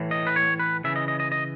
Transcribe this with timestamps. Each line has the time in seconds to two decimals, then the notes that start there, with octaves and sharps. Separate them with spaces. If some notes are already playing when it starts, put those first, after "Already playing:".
Already playing: A2 E3
0.11 D#5
0.27 B4
0.36 C#5
0.60 B4
0.84 C#3 E3 E5
0.96 D#5
1.08 D#5
1.20 D#5
1.32 D#5